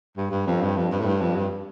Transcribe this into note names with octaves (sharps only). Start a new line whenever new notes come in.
G2
G2
F2
G2
F2
G2
A2
G2
F2
G2